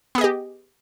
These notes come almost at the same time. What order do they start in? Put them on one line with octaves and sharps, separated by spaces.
B3 G#4 D#5 G4